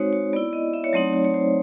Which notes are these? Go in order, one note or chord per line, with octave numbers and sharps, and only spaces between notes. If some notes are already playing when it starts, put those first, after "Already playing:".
Already playing: G#3 C4 D#4 F#4 C5 C#5
C#5
B3 E4 D5
D#5
E5
C#5
F#3 A3 C4 D#4 D5
C#5
C#5
C5